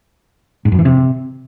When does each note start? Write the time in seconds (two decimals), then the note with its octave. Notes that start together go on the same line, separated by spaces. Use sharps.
0.65 G#2
0.72 F#2
0.78 E3
0.85 C3